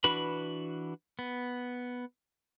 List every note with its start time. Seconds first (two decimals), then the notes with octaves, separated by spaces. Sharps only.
0.04 E3 D4 F#4 B4 B5
1.19 B3